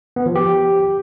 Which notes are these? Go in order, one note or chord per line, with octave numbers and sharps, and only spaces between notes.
B3
F3
G4